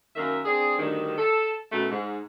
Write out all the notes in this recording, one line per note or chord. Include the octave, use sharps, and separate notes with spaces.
F#2 D#3 A#3 E5
C4 D4 G#4
D2 G2 D#3
A4
F#2 B2 A3
G#2